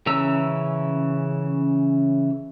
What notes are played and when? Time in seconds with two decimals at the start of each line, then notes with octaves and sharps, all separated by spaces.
0.06 C#3 E3 C#4 A#5 E6